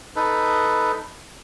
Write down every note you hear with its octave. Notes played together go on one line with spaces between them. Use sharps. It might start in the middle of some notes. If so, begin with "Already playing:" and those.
D#4 A4 B4